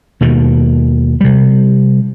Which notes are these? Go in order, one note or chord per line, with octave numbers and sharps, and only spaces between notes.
D#2 B2 D#3
C3 G3